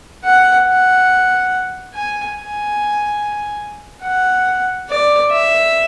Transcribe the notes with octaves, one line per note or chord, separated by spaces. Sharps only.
F#5
F#5
G#5
G#5
F#5
D5
E5